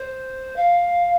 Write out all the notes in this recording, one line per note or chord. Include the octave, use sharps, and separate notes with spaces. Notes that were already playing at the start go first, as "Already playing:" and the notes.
Already playing: C5
F5